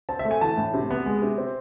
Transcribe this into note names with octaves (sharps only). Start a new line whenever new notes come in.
C4 A5
E5
A3
G#5
E3 A5
A2
C3
B3
G#3
C3
C4